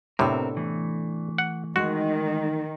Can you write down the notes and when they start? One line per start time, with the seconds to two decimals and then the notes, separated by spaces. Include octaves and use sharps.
0.19 A2 C3 B3 C4 D4 A4 A#4
0.57 E3 A3
1.38 F#5
1.76 D#3 G#3 F#4 D#5